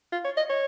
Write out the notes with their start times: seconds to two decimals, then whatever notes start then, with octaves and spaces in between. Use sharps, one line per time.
0.12 F4
0.25 C#5
0.37 D#5
0.49 C#5